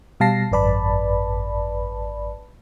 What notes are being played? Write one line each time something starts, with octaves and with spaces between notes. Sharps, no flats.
B2 G3 F5 A5 A#6 C7
G#1 F#2 B4 D5 A5 B5